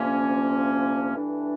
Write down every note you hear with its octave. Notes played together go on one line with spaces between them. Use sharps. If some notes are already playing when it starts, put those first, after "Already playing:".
Already playing: D2 C3 F3 A#3 C#4
G2 E3 A3 D4